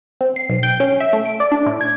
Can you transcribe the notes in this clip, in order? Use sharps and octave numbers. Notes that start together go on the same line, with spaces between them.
C4
C7
B1
G5
C#4
E5
A3
D7
D5
D4
A2
G#6